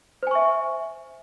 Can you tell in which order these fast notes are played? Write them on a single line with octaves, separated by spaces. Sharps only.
C5 G#5 C#6 E5